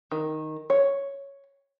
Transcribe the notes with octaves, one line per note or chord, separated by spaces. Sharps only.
D#3
C#5